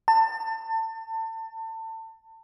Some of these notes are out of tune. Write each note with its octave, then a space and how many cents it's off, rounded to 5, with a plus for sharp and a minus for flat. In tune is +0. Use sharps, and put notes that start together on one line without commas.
A5 +30